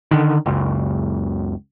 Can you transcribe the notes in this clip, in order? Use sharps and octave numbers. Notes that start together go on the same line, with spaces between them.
D3 D#3
F#1 C#2